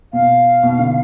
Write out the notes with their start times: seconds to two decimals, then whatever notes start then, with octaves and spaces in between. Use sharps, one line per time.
0.13 B2 F5
0.63 B2
0.79 D3